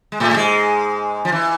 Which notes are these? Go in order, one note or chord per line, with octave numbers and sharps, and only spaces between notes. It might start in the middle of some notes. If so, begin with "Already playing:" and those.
G#3
A2 A3
A3
G#2 G#3
F3
E3